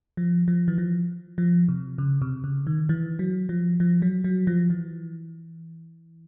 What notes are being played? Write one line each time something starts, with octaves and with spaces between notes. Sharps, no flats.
F3
F3
E3
F3
F3
C3
C#3
C3
C#3
D#3
E3
F#3
F3
F3
F#3
F#3
F3
E3